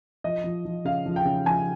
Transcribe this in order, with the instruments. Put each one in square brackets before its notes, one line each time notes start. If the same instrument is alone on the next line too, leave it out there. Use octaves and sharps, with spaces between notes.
[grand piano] F3 D#5
F3
F3
C#3 F5
F3
G5
C#3
F3 G#5